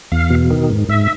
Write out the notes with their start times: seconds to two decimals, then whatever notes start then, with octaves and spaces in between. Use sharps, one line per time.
0.12 E2 F5
0.30 B2
0.51 D#3
0.70 G#2
0.89 G#2 E5